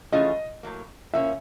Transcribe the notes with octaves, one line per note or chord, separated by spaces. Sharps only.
E3 A3 C#4 F4 G#4 D#5
A2 F#3 A#3
F3 A#3 C#4 E5